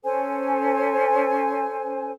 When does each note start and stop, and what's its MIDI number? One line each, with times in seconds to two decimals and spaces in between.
0.04 2.11 61
0.04 2.11 69
0.04 2.11 72
0.04 2.11 80